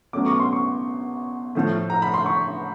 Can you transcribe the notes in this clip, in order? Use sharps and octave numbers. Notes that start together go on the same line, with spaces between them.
B2 F#3 A3 C#4 D6
C#6
C6
C#6
A2 F3 A3
A#5
B5
C6
C#6